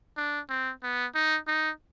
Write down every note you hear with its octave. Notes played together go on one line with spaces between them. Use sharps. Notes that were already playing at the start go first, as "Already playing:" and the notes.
D4
C4
B3
D#4
D#4